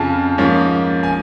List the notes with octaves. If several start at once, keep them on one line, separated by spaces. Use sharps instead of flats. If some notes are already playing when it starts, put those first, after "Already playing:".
Already playing: F2 C#3 F3 G#5 A5
G#2 F3 A#3 C#4
G#5